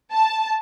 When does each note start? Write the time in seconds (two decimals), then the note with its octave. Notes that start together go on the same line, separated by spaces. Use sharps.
0.13 A5